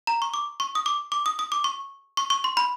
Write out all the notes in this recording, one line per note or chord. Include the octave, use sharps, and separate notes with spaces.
A#5
C#6
D6
C#6
D#6
D6
D6
D#6
D#6
D6
C#6
C#6
C#6
C6
B5